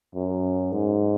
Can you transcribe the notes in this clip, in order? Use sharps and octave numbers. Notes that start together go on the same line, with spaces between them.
F#2
G#2